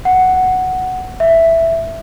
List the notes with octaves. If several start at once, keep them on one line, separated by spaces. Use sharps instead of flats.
F#5
E5